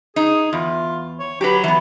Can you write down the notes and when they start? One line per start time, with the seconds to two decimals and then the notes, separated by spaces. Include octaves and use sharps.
0.16 D#4 G#4
0.53 E2 F4
1.19 C#5
1.41 F#3 G4 B4
1.64 E3 B3